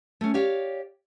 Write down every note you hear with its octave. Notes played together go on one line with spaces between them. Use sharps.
A3 C#4
G4 C#5 D5 F5